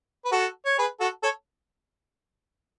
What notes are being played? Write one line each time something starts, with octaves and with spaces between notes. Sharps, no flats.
B4
F#4 A4
C#5
G#4 B4
F#4 A4
A4 C#5